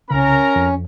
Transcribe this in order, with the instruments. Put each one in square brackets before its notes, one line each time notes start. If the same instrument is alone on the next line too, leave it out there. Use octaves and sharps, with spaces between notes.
[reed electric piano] C2 C#3 [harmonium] C#4 [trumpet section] A#4 A#5
[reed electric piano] F2